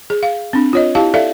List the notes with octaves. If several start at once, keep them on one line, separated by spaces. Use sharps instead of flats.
G#4
F5
C4 D4
F4 C#5 D#5
E4 G4 F5 A5
A4 D5 E5 F5